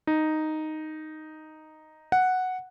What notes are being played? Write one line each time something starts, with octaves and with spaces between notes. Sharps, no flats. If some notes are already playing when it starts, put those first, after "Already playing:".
D#4
F#5